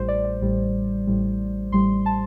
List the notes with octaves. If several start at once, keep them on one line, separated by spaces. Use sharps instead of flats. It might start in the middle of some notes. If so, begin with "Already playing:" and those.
Already playing: A1 A2 G3 C5
D5
D5
A1 A2 G3
A1 A2 G3
A1 A2 G3 C6
A5